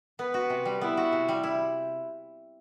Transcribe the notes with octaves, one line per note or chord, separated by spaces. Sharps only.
B3 B4
F#4
C3
G3
B3 E4
F#4
C3
G3
E4